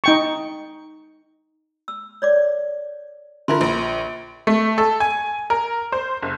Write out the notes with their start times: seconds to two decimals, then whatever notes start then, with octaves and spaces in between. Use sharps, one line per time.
0.04 D#4 G5 C#6
1.88 E6
2.22 C#5 D5 D6
3.48 D3 E4 F4 A#4 C6
3.61 A#1
4.47 A3
4.78 A4
5.00 G#5
5.50 A#4
5.92 C5
6.22 F#1